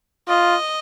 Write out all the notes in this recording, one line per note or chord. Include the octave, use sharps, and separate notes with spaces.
F4 D#5